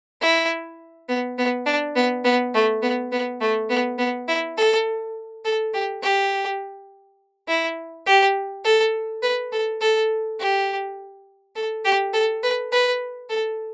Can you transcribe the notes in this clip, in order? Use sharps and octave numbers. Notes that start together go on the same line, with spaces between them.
E4
B3
B3
D4
B3
B3
A3
B3
B3
A3
B3
B3
E4
A4
A4
G4
G4
E4
G4
A4
B4
A4
A4
G4
A4
G4
A4
B4
B4
A4